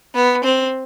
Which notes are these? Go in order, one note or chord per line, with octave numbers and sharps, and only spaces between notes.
B3
C4